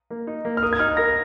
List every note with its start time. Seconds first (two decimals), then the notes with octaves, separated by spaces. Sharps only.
0.10 A#3
0.27 D#4
0.45 A#3
0.57 F6
0.62 A#4 D#6
0.73 G#6
0.79 D#4 F6
0.97 A#4 A#6